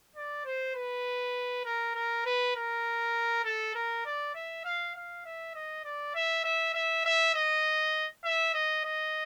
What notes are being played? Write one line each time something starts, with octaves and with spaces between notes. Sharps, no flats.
D5
C5
B4
A#4
A#4
B4
A#4
A4
A#4
D5
E5
F5
F5
E5
D#5
D5
E5
E5
E5
E5
D#5
E5
D#5
D#5